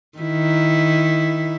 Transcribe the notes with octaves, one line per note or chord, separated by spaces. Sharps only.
D#3 E4